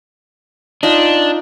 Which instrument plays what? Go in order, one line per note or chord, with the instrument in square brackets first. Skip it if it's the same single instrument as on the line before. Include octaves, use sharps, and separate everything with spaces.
[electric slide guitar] D4 [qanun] D#4 F4 F5